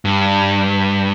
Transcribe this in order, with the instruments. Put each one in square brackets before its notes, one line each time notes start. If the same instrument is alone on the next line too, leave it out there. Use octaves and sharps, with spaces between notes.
[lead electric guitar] G2